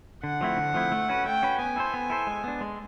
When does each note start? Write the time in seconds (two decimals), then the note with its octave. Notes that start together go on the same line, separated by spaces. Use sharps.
0.23 D3 F#5
0.41 F3 A3 C4 E4
0.57 D3
0.74 F3 A3 C4 E4
0.92 A3
1.09 C#4 F#4 B4
1.26 A3 G5
1.42 C#4 F#4 B4
1.59 B3 G#5
1.76 E4 A4 C5
1.94 B3
2.10 E4 A4 C5
2.27 G#3
2.44 B3 D4
2.61 G#3